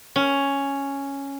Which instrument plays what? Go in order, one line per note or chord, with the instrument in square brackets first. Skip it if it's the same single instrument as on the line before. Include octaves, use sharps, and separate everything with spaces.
[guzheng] C#4